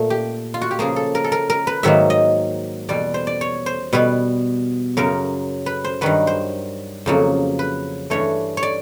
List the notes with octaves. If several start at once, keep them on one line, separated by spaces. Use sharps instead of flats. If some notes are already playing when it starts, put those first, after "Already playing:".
Already playing: A#2 A3
G4
F4
F#4
G4
C#3 F3 A#3 G#4
A4
A#4
A4
A#4
A#4
B4
G#2 D#3 F#3 A#3 E5
D#5
E2 B2 G3 D5
C5
D5
C#5
C5
B2 G3 B3 B4
F#2 C#3 F#3 A#4
B4
C5
G2 D#3 F#3 B4
C5
F2 C#3 F#3 A#3
B4
G2 E3 A3 C#5
C#5
D5